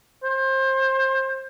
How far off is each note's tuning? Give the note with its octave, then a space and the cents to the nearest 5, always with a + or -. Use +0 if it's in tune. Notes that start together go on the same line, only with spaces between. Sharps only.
C5 +25